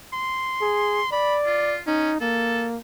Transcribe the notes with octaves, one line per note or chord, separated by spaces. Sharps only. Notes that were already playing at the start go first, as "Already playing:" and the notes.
C6
G#4
D5 B5
F4
C#4 D#4
A#3 A4